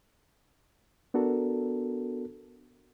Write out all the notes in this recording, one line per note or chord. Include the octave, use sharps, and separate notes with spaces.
B3 D4 F#4 A4 A#4